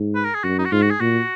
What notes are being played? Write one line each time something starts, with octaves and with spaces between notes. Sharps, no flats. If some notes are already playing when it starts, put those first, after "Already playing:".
Already playing: G#2
B4
A#4
G#4
F#2 F#4
D#4
F#4
G#2 F4
F#4
G#4
A#2 F#4